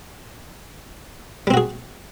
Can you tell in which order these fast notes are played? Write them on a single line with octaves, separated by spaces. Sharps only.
G3 C4 F#4 G#4